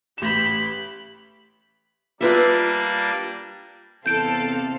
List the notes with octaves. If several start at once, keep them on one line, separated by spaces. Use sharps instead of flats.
A1 G4 B5 E7
G3 A#3 D4 F4 B4 E5
E2 C3 C4 A4 F5 G6 D7